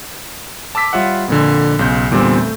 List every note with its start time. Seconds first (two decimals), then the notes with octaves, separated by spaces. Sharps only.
0.75 A5 D6 E6 B6
0.93 G3 F4 C#5 E5 F#5
1.28 F2 A#2 D3
1.79 B1 C#3 G6
2.11 E2 A#2 D3 G3 C4
2.38 A3